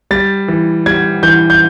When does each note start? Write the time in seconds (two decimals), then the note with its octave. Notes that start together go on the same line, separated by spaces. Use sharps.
0.11 G3 A6
0.48 E3
0.86 G3 G#6
1.23 E3 G6
1.50 G6